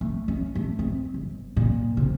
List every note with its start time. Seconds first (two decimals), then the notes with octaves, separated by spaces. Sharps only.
0.01 A3
0.28 C#4
0.55 A3
0.79 C4
1.14 G1
1.57 A#2
1.97 C3